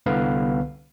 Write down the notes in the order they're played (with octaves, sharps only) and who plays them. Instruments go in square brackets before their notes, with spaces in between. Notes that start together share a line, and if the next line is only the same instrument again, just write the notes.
[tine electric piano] C2 D3 B3 B4 F5